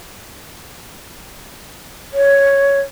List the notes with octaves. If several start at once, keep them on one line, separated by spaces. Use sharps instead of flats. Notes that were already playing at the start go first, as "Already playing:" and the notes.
C#5